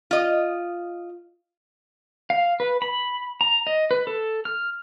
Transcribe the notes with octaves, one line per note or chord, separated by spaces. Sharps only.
F4 D#5
F5
B4
B5
A#5
D#5
B4
A4
F6